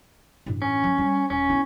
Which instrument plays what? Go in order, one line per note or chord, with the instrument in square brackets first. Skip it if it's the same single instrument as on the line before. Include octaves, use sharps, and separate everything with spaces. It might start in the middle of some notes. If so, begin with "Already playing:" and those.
[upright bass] A1 G2
[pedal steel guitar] C#4
[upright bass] F#3
G3
[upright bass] D#1 [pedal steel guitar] C#4
[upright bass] B3 E4